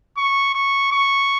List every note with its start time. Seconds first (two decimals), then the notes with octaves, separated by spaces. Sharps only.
0.17 C#6
0.55 C#6
0.92 C#6